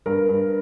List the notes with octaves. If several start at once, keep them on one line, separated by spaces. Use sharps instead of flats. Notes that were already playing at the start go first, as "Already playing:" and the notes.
G2 A#4
G2